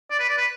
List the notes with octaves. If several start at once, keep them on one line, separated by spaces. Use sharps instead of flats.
D5
B4
D5
B4